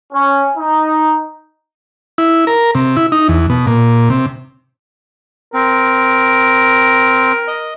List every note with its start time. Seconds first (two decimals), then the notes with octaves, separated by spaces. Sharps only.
0.13 C#4
0.58 D#4
2.18 E4
2.47 A#4
2.75 C3
2.97 E4
3.12 D#4
3.29 E2
3.50 B2
3.67 A#2
4.10 C3
5.54 C4 A#4
7.48 D#5